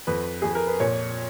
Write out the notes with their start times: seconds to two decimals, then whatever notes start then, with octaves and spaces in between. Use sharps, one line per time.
0.07 F2 B4
0.42 F2 G#4
0.55 A#4
0.67 B4
0.80 A#2 C#5